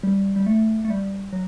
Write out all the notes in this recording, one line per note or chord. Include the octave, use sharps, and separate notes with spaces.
G3
G3
A3
A3
G3
F#3